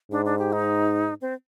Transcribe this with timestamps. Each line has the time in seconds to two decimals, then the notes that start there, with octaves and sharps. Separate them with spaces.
0.11 G#2 D4
0.25 D4
0.39 G4
0.52 D#4
1.21 C4